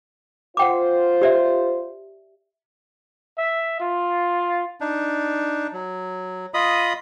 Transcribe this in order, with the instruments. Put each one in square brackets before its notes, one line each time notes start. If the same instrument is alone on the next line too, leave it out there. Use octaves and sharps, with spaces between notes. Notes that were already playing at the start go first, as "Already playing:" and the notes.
[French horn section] F4 C5 [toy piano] F#5 G5 D6
[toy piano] G4 D5 E5
[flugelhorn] E5
F4
[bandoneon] D4 D#4
F#3
F4 D#5 B5 D#6